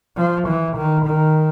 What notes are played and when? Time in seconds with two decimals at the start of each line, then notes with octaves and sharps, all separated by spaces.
0.17 F3
0.47 E3
0.77 D#3
1.06 D#3